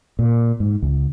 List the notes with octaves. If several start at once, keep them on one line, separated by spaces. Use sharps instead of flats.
A#2
G#2
C#2